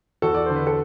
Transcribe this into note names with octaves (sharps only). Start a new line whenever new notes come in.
E2 F#4 A4
D5
D3 C5
B4
A4